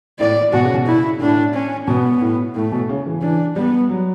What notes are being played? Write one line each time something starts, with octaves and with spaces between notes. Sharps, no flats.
A2 D5
B2 F#4
C#3
B2
E4
A2 D4
C#4
B2 B3
A2
A2 A3
B2
C#3
E3
E3 D4
G3 B3
F#3